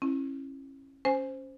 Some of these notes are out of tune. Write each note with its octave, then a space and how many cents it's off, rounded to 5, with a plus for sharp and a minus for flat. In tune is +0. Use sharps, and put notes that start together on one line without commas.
C#4 -30 E4 +0
C#4 +0 C5 +0 G#5 +0